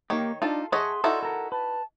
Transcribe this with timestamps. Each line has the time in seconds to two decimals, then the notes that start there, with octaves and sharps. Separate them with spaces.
0.10 D#3 A#3 G4 C#5
0.42 D4 D#4 F4 A4
0.72 G#4 A4 C#5 D#5 E5 F#5 C6
1.04 D#4 E4 F#4 A4 D5
1.23 A4 A#4 F#5
1.52 B4 A5